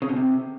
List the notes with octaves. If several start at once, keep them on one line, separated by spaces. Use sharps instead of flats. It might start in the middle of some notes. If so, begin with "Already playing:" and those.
C#3
B2
C3